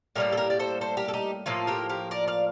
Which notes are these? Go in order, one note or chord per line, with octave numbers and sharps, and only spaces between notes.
A2 G3 A#3 G4 A#4
A4
G4 A#4
D5
A4 C5
A4 C5
G4 A#4
A4
D#4 G4
A2 F3 A#3 F4 A4
G4 A#4
G4 A#4
A#4 D5
D5 F5